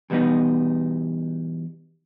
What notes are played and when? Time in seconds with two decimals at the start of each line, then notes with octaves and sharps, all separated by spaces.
0.10 E2 B2 G3 B3 D#4